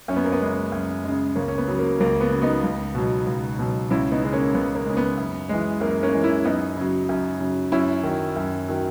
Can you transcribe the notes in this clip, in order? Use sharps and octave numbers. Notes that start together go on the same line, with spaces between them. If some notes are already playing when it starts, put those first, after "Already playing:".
F#2 C#4
B3
A#3
B3
C#3 G#3
F#2
C#3 G#3
C#2 A#3 C#4
C#4
B3
C#3 F#3
A#3
C#2 A#3
B3
C#3 F#3
B3 D#4
C#2
B2 F#3
C#2
B2 F#3
C#2 C#4 E4
B3 D#4
C#3 G#3
A#3 C#4
C#2 B3
A#3
C#3 G#3
B3
F#2
E3 G#3
F#2 A#3
A#3 C#4
E3 G#3
C#4 E4
F#2 B3 D#4
C#3 F#3
F#2
C#3 F#3
F#2 C#4 E4
D#3 F#3
F#2
D#3 F#3